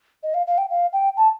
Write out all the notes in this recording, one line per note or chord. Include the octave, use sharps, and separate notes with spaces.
D#5
F5
F5
G5
F5
G5
A5